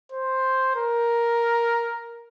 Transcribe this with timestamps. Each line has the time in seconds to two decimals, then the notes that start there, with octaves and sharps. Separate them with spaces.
0.12 C5
0.76 A#4